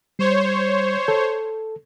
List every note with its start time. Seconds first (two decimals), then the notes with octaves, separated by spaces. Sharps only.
0.19 G3 C5 C#5
1.08 A4